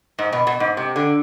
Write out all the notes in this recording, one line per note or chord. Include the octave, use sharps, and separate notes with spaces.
G#2
B2
B2
G#2
C3
D3